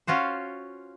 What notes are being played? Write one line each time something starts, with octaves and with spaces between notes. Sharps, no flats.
C#4 F4 F#4 C5